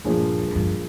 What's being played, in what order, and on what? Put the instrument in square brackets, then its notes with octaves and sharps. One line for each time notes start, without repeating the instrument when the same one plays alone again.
[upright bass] G2 [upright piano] A#2 F3 A#3 D4 G#4
[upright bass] G2
F2
G2